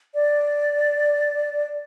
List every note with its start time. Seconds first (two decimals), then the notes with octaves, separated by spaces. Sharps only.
0.15 D5